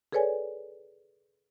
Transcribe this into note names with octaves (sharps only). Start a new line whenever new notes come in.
G#4 A4 B4 C#5 D5 G#5